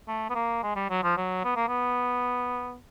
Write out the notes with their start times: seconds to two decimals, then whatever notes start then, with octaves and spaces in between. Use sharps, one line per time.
0.08 A3
0.30 B3
0.35 A#3
0.63 G#3
0.76 G3
0.90 F#3
1.03 F3
1.17 F#3
1.45 B3
1.56 A#3
1.68 B3